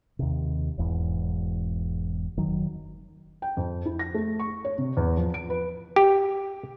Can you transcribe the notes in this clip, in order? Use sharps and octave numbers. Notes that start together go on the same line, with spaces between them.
D#2 C3
E1 E2 G#2
F#1 D#3 F#3
G5
F2
E4
A#6
A3
C#6
C#5
C3
E2
F3
D7
B4
G4